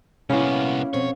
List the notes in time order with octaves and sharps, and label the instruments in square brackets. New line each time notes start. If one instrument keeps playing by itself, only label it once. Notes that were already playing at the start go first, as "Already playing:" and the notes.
[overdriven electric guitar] C2 B3 [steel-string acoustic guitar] A#3 E4 [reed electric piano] C#4 F5
[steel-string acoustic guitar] F2 B2 C4 [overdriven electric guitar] C#5